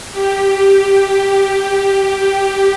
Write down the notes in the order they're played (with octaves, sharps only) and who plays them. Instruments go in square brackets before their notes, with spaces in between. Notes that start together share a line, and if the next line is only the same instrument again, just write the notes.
[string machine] G4